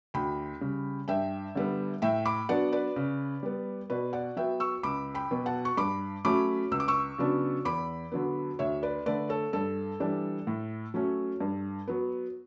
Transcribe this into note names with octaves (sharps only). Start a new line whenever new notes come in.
D2 G5 B5
C#3 G3
G2 E5 G5
D3 G3 B3
A2 E5 G5
B5 D6
F#3 B3 D4 D5 F#5
B4 D5
C#3
G3 B3
B2 B4 D5
D5 F#5
F#3 B3 E5 G5
C#6 E6
C#2 B5 D6
G5 B5
B2 F#3 B3
F#5 A5
C#6
G2 B5 D6
F#3 A3 C#4 B5 D6
C#2 E6
D6
C#6 E6
C#3 F#3 B3 D4
E2 B5 D6
D3 F#3 B3
D2 C#5 E5
B4 D5
D3 A3 B4 D5
A4 C#5
G2 A4
E3 G3 D4
A2
F#3 A3 C#4
G2
F#3 B3